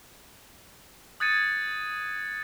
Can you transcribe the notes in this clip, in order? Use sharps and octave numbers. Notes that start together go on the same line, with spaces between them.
D#6 F#6 G#6 A6 C#7 D#7